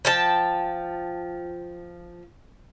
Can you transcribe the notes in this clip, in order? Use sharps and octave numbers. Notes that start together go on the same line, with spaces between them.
F3 G5 A5